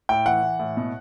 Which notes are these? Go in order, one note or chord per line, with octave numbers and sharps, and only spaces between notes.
A2 G5
E3 F#5
E3
A2
B2